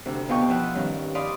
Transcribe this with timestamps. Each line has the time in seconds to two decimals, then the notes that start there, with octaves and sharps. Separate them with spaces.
0.06 D2 C3
0.29 B2 F4 D#5 F5 G5 C#6
0.48 F3 E4 B4 F5 F#5
0.75 G2 D#3 C#4
1.15 D5 D#5 F5 B5 C6 D#6